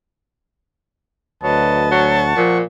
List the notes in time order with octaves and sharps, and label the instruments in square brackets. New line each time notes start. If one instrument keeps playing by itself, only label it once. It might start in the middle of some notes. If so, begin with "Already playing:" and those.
[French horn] D2 [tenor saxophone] F#3 [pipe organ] B4 D#5 [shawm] A5
[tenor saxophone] F#3 [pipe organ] F#5 C#6
[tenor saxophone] A#2 [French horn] F3